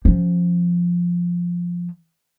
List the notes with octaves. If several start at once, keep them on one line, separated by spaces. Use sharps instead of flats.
F3 C#4